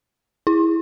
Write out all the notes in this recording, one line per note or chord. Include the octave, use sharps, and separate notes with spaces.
E4